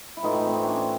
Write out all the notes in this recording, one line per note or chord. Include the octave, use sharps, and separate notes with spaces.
E4
A2 E3 A3 D#4 F4
C4
C#4 D4